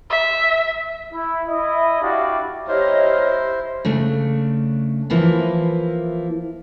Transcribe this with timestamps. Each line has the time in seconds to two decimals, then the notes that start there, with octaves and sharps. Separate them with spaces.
0.11 E5
1.13 E4
1.47 E4 D#5
2.02 D4 E4 F#4 G4 D5 F5
2.68 E4 G4 C5 C#5 D#5 A#5 F6
3.85 C#3 A3 D4
5.10 E3 F3 A#3 E4 F4